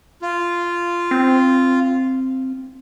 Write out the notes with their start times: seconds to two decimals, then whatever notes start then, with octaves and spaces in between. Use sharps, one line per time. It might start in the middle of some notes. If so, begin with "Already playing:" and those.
0.22 F4
1.11 C4